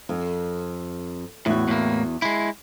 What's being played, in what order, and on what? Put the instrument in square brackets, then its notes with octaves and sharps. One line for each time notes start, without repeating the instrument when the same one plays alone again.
[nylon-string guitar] F2
[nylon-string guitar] E2 F#4 [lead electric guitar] A2
[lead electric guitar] A2 A#3
G#3 E4